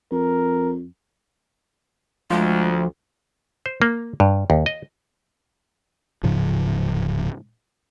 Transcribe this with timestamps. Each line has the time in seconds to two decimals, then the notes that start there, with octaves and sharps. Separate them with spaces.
0.12 F2 A#4
2.30 D2 F3 G#3
3.66 C5
3.82 A#3
4.20 G2
4.50 D#2
4.66 D#5
6.23 D1 G#2 C#3 F3